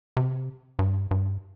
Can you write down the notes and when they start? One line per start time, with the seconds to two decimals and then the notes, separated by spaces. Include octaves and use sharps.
0.17 C3
0.79 G2
1.11 G2